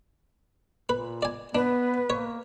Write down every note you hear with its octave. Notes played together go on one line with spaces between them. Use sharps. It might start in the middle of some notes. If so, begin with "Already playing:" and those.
A#2 B4
D5 G#5
B3 D4 B4
A#3 C#5